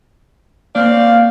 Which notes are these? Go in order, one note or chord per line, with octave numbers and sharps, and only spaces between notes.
A#3 C4 C#4 D5 F5